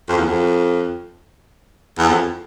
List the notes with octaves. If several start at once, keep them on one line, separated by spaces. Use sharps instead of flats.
F2
E2
F2
E2
F2